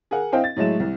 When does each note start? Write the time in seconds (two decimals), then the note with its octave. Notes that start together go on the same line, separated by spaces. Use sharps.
0.11 G#4 A#4 F#5
0.32 C4 E4 C5 D#5 F5 G5
0.44 A6
0.56 A2 F#3 G#3 A3 E7
0.80 C2